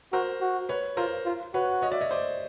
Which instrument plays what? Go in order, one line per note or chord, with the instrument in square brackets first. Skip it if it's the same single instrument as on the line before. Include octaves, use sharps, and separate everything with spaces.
[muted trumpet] F#4 [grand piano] A#4 C5
[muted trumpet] F#4
[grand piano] B4 C#5
[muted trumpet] F4 [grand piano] A#4 C5
[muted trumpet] F4
[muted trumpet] F#4 [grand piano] B4 C#5
[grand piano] C#5 D#5
D5 E5
C#5 D#5
C5 D5